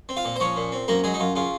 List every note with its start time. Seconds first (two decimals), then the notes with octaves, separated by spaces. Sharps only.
0.09 C4
0.17 F4 F5
0.25 A#2
0.36 C5
0.40 F3 C#4 C#5
0.56 A#2
0.72 C4
0.88 F#2 A#3 A#4
1.04 F#3 G#3 G#4
1.14 D#4
1.20 F#2 F4
1.36 C#3 F4